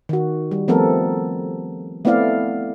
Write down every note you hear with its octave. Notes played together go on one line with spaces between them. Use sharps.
D#3 F#4
G3
F3 A3 B3 C4 A4 A#4
A3 B3 C4 E4 D5 F5